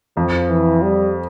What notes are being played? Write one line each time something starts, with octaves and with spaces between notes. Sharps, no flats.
F2 F3
E3
G3